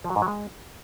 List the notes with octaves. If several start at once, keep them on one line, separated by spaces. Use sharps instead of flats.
F3
F#3
G#2
F#3
G#3